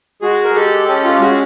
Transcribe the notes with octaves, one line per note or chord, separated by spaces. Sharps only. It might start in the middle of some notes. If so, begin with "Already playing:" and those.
G#3 F#4 G#4
A#4
G#3 G4 A4
C#4 G4 A4
F4 G4
G4
G#3 F#4 G#4